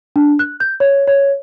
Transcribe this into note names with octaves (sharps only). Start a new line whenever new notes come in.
D4
F#6
G6
C#5
C#5